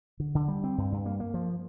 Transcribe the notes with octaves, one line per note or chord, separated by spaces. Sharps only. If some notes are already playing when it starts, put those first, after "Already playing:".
D3
D3
G3
C4
G2
G2
A#3
A#3
F3